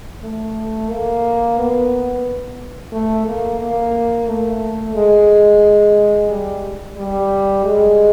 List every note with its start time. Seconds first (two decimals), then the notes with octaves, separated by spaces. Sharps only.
0.23 A3
0.90 A#3
1.58 B3
2.92 A3
3.27 A#3
3.61 A#3
4.27 A3
4.95 G#3
6.30 G3
6.97 G3
7.65 G#3